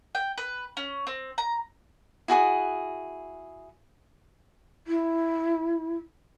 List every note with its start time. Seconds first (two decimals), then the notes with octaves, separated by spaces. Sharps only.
0.15 G5
0.38 B4
0.77 C#4
1.07 C4
1.38 A#5
2.28 E4 F#4 G#4 D#6
4.87 E4